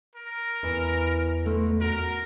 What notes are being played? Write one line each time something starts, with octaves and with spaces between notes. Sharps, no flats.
A#4
E2 E3
D3 A3 C5
F#4 A#4 F#5